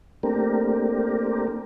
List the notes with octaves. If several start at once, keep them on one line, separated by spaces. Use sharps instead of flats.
A3 A#3 C4 D4 G4 A#4